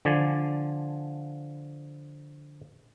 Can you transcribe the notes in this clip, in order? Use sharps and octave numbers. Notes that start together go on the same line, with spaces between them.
D3 F3 D5 G#5